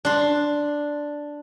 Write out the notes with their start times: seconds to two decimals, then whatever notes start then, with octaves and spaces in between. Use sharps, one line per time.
0.05 D4 C6